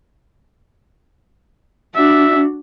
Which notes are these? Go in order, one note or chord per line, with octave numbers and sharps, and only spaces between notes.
D4 F#4 E5